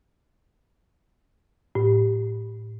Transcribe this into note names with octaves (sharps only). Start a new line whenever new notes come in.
A2